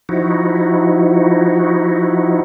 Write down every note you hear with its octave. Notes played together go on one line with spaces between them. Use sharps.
F3 D#4 E4 F#4